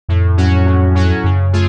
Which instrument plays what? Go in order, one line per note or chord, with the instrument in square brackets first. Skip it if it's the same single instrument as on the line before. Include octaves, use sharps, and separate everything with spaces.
[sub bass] F2 [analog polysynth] A2
[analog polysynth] F#3 C#4 F#4
A2
F#3 C#4 F#4
[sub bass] F#2 [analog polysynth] C#3
[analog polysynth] A3 F4 G#4